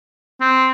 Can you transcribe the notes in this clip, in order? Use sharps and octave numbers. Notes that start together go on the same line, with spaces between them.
C4